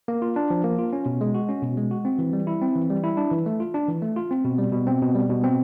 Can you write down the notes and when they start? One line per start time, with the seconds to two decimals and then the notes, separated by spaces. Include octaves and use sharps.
0.08 A#3
0.22 F4
0.36 D4
0.50 F3
0.64 A#3
0.79 F4
0.93 C#4
1.06 B2
1.21 G#3
1.34 F#4
1.48 C#4
1.62 B2
1.77 G#3
1.91 F#4
2.05 C4
2.19 E3
2.33 G3
2.47 E4
2.62 C4
2.75 E3
2.90 G3
3.04 E4
3.17 D4
3.31 E3
3.46 A3
3.60 F4
3.74 D4
3.88 E3
4.02 A3
4.16 F4
4.31 C4
4.45 B2
4.58 G3
4.72 B2
4.87 C4
5.02 B2
5.14 G3
5.29 B2
5.44 C4